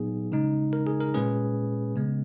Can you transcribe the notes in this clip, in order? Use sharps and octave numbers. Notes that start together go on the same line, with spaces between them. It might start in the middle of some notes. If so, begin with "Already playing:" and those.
Already playing: A#2 F#3 B3 D#4 G#4
C#3 G#3 D#4
A#4
G#4
A#4
A#2 G#3 C#4 G#4 B4
C#3 G#3 B3